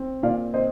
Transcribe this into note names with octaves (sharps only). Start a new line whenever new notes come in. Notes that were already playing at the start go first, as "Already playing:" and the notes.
Already playing: C4
A#2 D5 F5
C4 C5 D#5